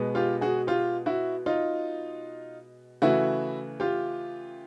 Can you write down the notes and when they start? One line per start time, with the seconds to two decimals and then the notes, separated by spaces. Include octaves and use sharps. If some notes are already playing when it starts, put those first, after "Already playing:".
Already playing: B2 G#3 B3
0.15 F4 G4
0.41 F#4 G#4
0.67 F4 G4
1.06 E4 F#4
1.46 D#4 F4
3.02 C#3 E3 A3 E4 F#4
3.80 F4 G4